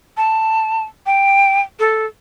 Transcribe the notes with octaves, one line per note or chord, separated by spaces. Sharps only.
A5
G5
A4